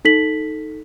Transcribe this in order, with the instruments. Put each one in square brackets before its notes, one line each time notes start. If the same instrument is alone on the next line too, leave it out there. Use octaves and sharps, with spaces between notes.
[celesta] D#4 A4 B6 F#7